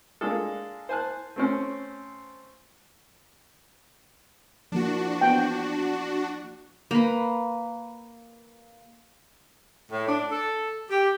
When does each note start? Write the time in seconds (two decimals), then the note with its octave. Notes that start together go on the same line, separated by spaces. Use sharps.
0.21 G#3 A#3 D4 F4 G#4 A4
0.89 C5 G#5 A5 F#6
1.36 A3 C4 C#4
4.72 F3 A#3 D4 E4 F#4
5.21 B3 G5
6.91 A#3 B4
9.91 A2
10.07 D4
10.30 A4
10.90 G4